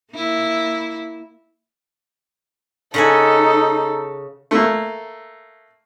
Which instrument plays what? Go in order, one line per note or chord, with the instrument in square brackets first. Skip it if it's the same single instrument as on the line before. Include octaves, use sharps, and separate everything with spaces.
[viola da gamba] A#3 E4
[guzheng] C#3 F#5 G#5 [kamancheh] D#4 A4
[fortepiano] A3 A#3